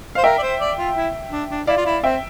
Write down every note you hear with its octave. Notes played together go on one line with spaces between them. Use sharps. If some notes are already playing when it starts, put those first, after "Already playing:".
C5 F5
A#4 E5 G5
D5
C5
D5
F4
E4
D4
D4
E4 D5 F5
F4
E4
C4 E5 G5